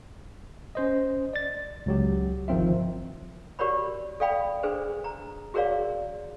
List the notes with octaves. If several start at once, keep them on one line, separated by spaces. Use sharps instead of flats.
C#4 C5 D#5
D5 A6
C#2 F#3 G4
G1 D#3 F3 C4 F4 E5
F#4 G4 A#4 C#5 D5 B5
A4 D5 F5 G5 B5
D4 G#4 A4 B4 C5
A#5
F#4 G#4 A#4 C#5 D5 F5